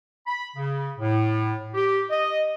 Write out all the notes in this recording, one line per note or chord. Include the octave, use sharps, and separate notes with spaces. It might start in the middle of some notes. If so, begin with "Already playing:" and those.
B5
C#3
A2
G4
D#5